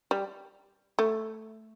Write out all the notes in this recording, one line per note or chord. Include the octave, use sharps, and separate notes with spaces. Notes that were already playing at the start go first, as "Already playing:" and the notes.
G3
A3